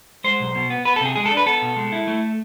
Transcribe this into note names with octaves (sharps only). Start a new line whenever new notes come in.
G#3 C5
B1
B2
B3
B3 B4
A4
C3 G#4
G#3 G#4
A4
D4
B4
B3 A4
B2
G#3
E4
A3